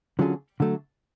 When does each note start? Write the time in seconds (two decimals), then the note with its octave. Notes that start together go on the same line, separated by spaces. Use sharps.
0.19 D3 F#3 C#4 F4 G#4
0.60 D3 F#3 A3